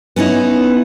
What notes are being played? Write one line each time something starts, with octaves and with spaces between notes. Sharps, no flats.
B3 C#4 D#4 E4